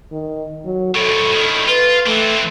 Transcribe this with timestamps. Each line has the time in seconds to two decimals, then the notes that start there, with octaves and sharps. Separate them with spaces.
0.12 D#3
0.65 F#3
0.95 C2 A2 A4
1.32 A2 D#3
1.68 F4 B4
2.06 E3 A3 C4